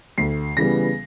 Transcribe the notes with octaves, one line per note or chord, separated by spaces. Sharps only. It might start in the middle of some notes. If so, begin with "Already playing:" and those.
D2 C7
C#3 E3 G3 B3 A#6